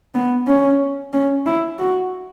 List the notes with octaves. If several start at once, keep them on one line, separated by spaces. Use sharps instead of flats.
B3
C#4
C#4
E4
F#4